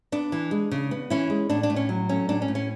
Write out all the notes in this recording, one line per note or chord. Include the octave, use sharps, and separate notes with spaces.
B3 D4
E3
G#3
C#3
B3
E3 C#4 E4
G#3
A2 D4
D4
A2
C#4
F#3
A3 C#4
A2 D4
C#4
A2
C#4